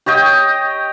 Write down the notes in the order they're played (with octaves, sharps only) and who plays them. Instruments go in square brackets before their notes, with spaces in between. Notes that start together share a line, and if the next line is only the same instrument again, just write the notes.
[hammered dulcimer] G4 C#5 D#5 G5